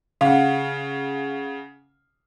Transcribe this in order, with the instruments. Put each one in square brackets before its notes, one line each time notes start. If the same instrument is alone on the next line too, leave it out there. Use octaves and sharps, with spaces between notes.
[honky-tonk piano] C#3 [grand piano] F5 F#5